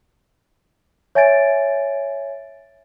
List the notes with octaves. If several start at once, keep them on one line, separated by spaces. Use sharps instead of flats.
C#5 E5 G#5 G#6 A6 D7